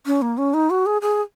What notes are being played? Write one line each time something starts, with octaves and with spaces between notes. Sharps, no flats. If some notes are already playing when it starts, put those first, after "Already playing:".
C#4
A#3
C#4
D#4
F#4
G#4
G#4